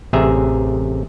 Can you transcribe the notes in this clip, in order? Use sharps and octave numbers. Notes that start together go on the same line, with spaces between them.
A1 C3 G#4 E5 A#5